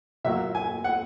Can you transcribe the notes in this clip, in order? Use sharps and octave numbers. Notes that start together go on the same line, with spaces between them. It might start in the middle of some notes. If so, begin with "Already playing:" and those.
A#2 F#3 A#3 E5
G#5
F#5